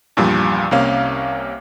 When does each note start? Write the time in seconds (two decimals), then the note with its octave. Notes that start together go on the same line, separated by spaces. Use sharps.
0.17 E2 G2 A#2 F3 G3
0.71 C2 C3 A#3 C#4 F5